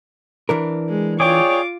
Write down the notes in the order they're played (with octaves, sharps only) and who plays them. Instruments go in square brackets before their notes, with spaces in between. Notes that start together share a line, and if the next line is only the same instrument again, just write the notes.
[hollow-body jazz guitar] E3 D4 A#4
[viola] G#3
[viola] F4 D6 [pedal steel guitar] G#4 D5 G5 [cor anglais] C#5